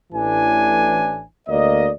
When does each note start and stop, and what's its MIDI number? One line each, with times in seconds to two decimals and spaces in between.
0.13 1.23 33
0.13 1.23 45
0.13 1.23 52
0.13 1.23 62
0.13 1.23 80
1.47 1.89 38
1.47 1.89 58
1.47 1.89 74
1.47 1.89 75